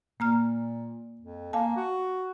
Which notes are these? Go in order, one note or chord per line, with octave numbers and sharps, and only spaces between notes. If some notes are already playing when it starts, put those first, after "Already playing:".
A#2 A#3 A#5 F6
F2
A#3 F5 G#5 A5
F#4